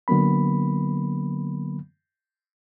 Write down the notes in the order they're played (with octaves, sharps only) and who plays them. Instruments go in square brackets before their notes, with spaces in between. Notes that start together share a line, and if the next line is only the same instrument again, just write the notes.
[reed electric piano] D3 F#3 A#3 B3 B5